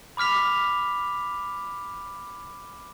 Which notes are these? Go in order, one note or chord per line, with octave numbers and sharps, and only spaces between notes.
B5 D6 F6 B6 F7